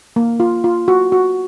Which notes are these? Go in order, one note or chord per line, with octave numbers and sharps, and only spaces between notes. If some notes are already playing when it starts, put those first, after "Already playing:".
A#3
F4
F4
F#4
F#4